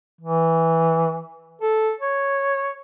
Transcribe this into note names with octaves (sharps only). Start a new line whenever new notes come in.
E3
A4
C#5